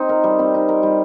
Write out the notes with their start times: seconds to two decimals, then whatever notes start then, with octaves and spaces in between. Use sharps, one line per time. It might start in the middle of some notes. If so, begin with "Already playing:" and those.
Already playing: C4 D#4
0.09 A#4
0.24 G3
0.39 C4
0.54 D#4
0.69 A#4
0.83 G3